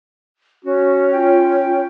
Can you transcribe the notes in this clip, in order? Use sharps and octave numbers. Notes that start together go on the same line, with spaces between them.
C#4 F#4
F4 G5